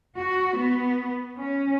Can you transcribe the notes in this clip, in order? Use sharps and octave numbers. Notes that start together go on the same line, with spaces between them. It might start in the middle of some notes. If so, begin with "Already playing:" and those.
F#4
B3
C#4